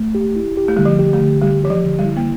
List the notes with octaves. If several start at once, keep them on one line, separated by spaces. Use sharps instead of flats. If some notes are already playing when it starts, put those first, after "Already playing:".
Already playing: A3
G4
E4
G4
A3
D3 G3
F3
G4
A3
D3
G3 G4
E3 G4
F3
D3
G3
E4
A#3